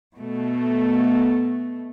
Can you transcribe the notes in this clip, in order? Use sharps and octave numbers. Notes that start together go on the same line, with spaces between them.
B2 A3